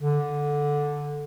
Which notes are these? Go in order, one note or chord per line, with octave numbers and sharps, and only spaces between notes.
D3